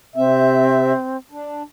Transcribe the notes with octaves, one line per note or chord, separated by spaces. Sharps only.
C3 C4 E5
D4